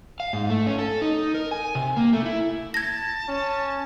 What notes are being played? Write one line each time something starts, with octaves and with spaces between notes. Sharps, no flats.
F5
G#2
A3
C#4
A4
D#4
A#4
G#5
C3
A#3
A3
E4
A5 G#6 A#6
C#4